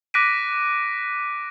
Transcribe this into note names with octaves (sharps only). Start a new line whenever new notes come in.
D6 F#6 A#6 B6 D7 D#7